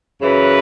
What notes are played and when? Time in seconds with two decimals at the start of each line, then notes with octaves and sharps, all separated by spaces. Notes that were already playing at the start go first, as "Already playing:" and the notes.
0.21 F#2 C#3 E3 B4